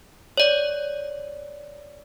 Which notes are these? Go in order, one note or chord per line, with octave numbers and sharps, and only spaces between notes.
C#5 D5